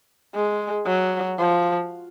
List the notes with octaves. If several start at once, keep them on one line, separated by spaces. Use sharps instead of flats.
G#3
F#3
F3